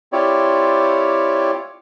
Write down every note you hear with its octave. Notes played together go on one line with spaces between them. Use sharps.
C4 E4 F4 G4 C#5 D5